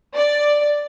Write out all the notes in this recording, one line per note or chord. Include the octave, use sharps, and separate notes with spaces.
D5